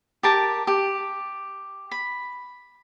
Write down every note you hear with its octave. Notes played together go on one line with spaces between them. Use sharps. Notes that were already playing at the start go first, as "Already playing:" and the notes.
G4 A#4 A5
G4
B5